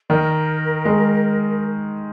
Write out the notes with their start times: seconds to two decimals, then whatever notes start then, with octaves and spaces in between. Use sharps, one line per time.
0.10 D#3 A#4
0.85 G#3